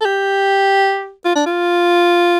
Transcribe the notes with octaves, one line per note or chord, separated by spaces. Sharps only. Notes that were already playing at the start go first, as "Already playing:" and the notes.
A4
G4
F4
D4
F4